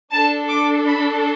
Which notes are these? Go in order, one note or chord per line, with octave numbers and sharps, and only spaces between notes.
D4 A4 A5
D6
B5